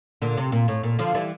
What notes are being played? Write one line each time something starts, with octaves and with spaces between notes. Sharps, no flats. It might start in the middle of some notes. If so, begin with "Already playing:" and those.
A#2 D3
C3
A#2
A2
A#2
D3 F3
E3 G3